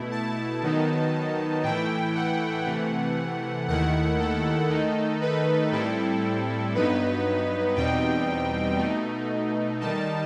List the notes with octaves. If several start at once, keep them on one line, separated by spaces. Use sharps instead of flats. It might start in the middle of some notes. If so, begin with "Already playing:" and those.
Already playing: B2 A3 E4
A5
D#3 F#3 B3 D#4
A2 E3 A3 E4 G5
F#5
C3 E3 A3
D#2 D#3 A3 E4 F#5
A4
D#3 A3 D#4
B4
A2 G3 C4 E4 A4
G2 F#3 B3 D#4 B4
E2 B2 G3 C4 D#4 G5
B2 A3 D#4
D#3 G3 D#4 A5